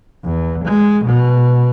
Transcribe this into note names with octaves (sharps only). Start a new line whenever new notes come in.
E2
G#3
B2